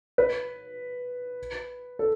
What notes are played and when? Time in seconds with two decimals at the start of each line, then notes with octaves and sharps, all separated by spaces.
0.18 B4
1.99 A4